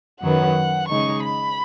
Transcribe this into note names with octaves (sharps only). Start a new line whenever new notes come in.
F#2 D#3 F#3 B3 F#5
C#3 G#3 D#4 C#6
B5